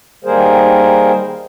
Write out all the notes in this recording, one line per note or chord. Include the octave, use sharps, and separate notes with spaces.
D#3 G3 A#3 G#4 A#4 C5